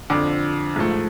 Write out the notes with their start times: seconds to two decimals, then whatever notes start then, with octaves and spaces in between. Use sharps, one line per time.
0.10 F2 D3 F3 D6
0.76 G#2 F3 A3